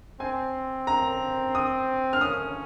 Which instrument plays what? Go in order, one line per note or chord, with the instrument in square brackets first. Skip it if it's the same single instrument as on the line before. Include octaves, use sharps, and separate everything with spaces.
[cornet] C4 [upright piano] G#5
[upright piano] A#5
D#6
F6
[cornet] C#4 [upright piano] D#6